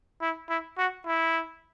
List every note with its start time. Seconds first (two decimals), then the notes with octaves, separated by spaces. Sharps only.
0.22 E4
0.49 E4
0.78 F#4
1.06 E4